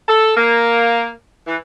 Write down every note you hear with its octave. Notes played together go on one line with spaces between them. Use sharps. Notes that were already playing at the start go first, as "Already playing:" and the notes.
A4
A#3
E3